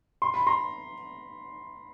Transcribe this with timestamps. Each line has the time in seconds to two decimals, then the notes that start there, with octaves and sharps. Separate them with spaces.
0.22 C6
0.34 B5
0.47 A#5 C6